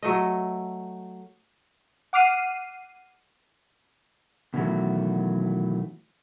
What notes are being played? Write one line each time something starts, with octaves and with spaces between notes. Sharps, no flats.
F#3 A3 D#5
F#5 D6 F6 C7 D#7
B2 D#3 E3 F#3 A3